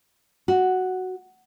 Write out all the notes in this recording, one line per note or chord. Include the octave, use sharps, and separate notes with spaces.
F#4